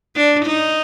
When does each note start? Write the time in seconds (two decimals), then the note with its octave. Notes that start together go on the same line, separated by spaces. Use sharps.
0.16 D4
0.46 D#4